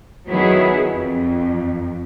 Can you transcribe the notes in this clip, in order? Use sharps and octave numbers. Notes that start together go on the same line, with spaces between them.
D#3 F#3 B3 E4 G#4
F2